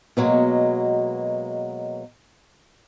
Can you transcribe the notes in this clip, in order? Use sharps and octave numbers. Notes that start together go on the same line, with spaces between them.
B2 F#3 G#3 A#3